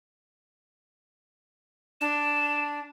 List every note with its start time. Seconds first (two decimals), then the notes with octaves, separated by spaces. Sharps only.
2.01 D4 E7